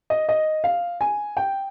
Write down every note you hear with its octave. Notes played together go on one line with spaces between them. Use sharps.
D#5
D#5
F5
G#5
G5